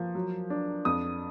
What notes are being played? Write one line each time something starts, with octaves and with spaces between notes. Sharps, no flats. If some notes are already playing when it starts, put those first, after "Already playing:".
Already playing: F3 A#3
F#3
D4
F2 D#6